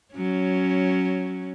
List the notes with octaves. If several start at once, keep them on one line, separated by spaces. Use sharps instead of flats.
F#3 C#4